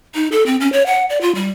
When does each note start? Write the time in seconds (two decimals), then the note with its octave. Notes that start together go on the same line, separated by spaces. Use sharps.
0.15 D#4
0.32 A4
0.46 C4
0.60 C#4
0.72 C#5
0.86 F#5
1.10 D5
1.21 F4
1.35 G3